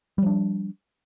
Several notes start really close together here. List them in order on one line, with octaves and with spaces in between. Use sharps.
G3 F3 D4